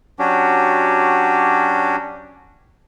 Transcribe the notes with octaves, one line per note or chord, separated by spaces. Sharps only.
F#3 C#4 D4 F#4 G4